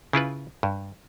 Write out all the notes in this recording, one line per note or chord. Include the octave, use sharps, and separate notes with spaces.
C#3 E4 F4 B4
G2